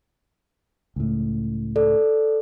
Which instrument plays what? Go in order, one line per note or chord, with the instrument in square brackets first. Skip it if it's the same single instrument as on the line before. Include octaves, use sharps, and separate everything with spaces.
[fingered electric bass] C#2 A2
[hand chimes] A4 D5